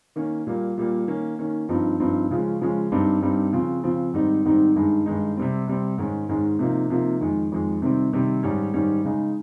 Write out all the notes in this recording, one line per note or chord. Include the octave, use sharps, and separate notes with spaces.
D#3 A#3 C#4
A#2 G3 A#3
A#2 G3 A#3
D#3 A#3 C#4
D#3 A#3 C#4
G2 F3 C4 D#4
G2 F3 C4 D#4
C#3 F3 G#3 C#4
C#3 F3 G#3 C#4
G2 G3 C4 D#4
G2 G3 C4 D#4
C#3 F3 C4
C#3 F3 C4
G#2 D#3 G3 C4 D#4
G#2 D#3 G3 C4 D#4
G2 D#3 G#3 D#4
G2 D#3 G#3 D#4
C3 G3 C4
C3 G3 C4
G#2 D#3 G#3 C#4
G#2 D#3 G#3 C#4
C3 F3 A#3 D#4
C3 F3 A#3 D#4
F2 D#3 G#3
F2 D#3 G#3
C3 D#3 G3 C4
C3 D#3 G3 C4
G#2 D#3 G3 C#4
G#2 D#3 G3 C#4
C#3 G#3 D#4